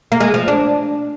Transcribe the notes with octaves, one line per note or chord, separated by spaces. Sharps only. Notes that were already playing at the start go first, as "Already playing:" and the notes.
A#3
G#3
F3
D4